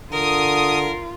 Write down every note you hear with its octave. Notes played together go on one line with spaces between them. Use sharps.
D3 F4 A#4 D#6